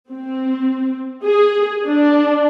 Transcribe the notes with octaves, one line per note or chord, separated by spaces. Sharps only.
C4
G#4
D4